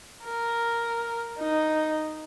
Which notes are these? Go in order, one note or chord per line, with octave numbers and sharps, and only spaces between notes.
A#4
D#4